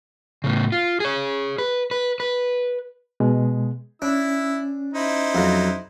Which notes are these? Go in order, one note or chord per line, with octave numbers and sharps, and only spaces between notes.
A2 C#3
F4
G#4 C#5
B4
B4
B4
B2 G#3
C#4 D4 E4 E6
D#4 E4 C5
F2 F#3